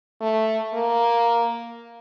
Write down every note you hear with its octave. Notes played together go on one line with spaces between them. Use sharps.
A3
A#3